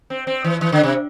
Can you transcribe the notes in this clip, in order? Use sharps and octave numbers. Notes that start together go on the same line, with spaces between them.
C4
C4
E3
E3
D3
C3